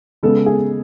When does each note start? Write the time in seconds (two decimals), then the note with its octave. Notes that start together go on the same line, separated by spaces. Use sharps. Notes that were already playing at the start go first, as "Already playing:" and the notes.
0.23 C#3 G#3 B3 A4
0.46 G#4